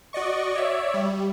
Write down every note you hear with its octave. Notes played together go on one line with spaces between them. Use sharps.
F#4 D5 D#5 C#6
C#5 D5 E5
G3